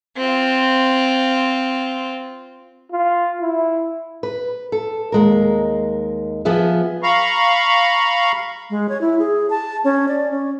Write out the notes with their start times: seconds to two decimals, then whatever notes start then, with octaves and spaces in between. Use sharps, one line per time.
0.17 C4 F4
2.92 F4
3.40 E4
4.23 B4
4.72 A4
5.12 D#2 G#3 A#4
6.45 F3 B3 G#4 E5
7.03 F5 A#5 B5 C#6
8.70 G#3
8.89 C#5
9.01 E4
9.19 G#4
9.50 A5
9.84 C#4
10.08 D5
10.31 C#4